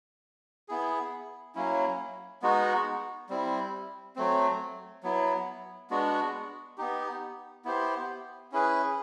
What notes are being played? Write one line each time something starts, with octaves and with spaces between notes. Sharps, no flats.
B3 E4 G#4
F#3 A#3 C#4 E4
G#3 B3 D#4 F#4
G3 C4 E4
F#3 A3 C4
F#3 B3 E4
G#3 B3 D4 F#4
B3 D#4 G4
B3 E4 G4 C5
C#4 E4 G#4 B4